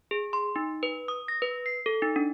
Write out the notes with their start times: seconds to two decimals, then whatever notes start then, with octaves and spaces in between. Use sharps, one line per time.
0.11 G#4
0.33 C6
0.56 D#4
0.83 B4
1.08 D#6
1.28 A#6
1.42 B4
1.66 C7
1.86 A4
2.02 D#4
2.16 D4